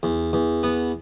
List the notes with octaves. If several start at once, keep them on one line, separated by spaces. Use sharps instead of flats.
E2
E2
B3